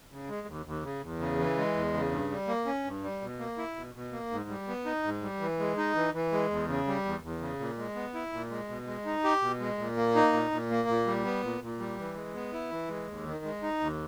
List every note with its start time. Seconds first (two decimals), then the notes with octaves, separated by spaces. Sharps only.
0.11 C#3
0.29 G#3
0.47 D#2
0.66 D#2
0.83 C#3
1.02 E2
1.20 C#3
1.39 E3
1.57 G#3
1.75 E2
1.94 C#3
2.11 G2
2.30 G3
2.48 A#3
2.66 C#4
2.84 G2
3.03 G3
3.22 B2
3.39 A#3
3.58 E4
3.76 B2
3.95 B2
4.12 A#3
4.31 G#2
4.49 G3
4.68 B3
4.85 D#4
5.03 G#2
5.22 G3
5.40 E3
5.59 G#3
5.77 D#4
5.95 E3
6.13 E3
6.32 G#3
6.50 E2
6.68 C#3
6.87 G3
7.05 E2
7.23 E2
7.41 C#3
7.59 A#2
7.78 G#3
7.95 B3
8.14 E4
8.32 A#2
8.51 G#3
8.68 B2
8.87 G#3
9.05 D#4
9.24 G4
9.42 B2
9.60 G#3
9.78 A#2
9.96 A#3
10.15 D#4
10.33 A#2
10.51 A#2
10.70 A#3
10.88 A#2
11.06 G3
11.25 B3
11.43 A#2
11.61 A#2
11.79 G3
11.98 E3
12.15 G#3
12.34 B3
12.53 E4
12.71 E3
12.88 G#3
13.07 D#2
13.26 D#3
13.44 G#3
13.63 D#4
13.80 D#2